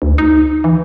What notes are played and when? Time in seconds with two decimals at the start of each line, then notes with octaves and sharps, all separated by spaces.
0.02 D2
0.18 D#4
0.64 E3